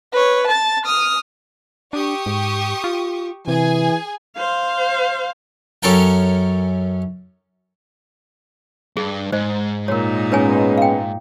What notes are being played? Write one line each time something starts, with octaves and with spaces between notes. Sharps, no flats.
B4 C#5
A5 A6
D#6 F6
D4 G4 C#6 D#6
G#2
F4
C3 E3 G#4 G#5
C5 F5
F#2 C#4 A4 A#4 G5
G2 G#4
G#2 C5 D#5
A#2 D#4 A#4 C#5
G#3 B3 C#4 B4 C#5 G#5
F5 G5